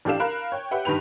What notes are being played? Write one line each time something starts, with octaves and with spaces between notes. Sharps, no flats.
A1 D4 G4 A4 F5 E7
A#4 F5 B5 F#6
C#5 G5
G4 B4 E5 F#5 G5
G2 D#3 G4 B4 F7